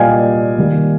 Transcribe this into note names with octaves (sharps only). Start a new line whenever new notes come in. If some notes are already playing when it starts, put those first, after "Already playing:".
Already playing: A#2 G3 A#3 D5 D#5 F5 G5 G#5
D#3 G3 A#3